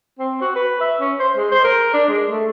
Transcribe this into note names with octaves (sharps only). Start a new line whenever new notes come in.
C4
F#4
B4
E5
C#4
C5
G#3
C5
A#4
D4
G#3
A3